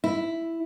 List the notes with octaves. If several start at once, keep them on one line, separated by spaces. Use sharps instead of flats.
E4